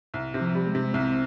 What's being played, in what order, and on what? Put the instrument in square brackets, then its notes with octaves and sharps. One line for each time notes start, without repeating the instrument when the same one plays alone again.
[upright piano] C2
C3
[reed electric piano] F3
[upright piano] G3
[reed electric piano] G#3
[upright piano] C3
[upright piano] C2 [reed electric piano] C4